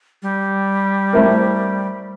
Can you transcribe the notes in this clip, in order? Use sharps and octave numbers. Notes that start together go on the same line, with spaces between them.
G3
A3 C4 E4 A#4